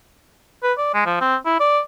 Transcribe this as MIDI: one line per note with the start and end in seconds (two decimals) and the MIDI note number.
0.63 0.73 71
0.78 0.90 74
0.94 1.04 56
1.06 1.19 53
1.21 1.36 60
1.45 1.60 64
1.60 1.80 74